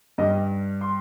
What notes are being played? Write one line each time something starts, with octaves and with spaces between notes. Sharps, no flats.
G2 G3 D#5
C6